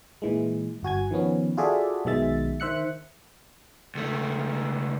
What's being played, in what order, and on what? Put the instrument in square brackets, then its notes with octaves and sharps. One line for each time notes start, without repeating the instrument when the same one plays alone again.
[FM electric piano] A#2 E3 G#3
G1 F#4 G#5 G#6
D#3 F3 B3 C#4
F4 F#4 G#4 A4 D5 E5
B1 B2 D#3 G#3 E5 A6
D#3 C5 E5 F#6 C#7
[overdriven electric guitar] C#2 A3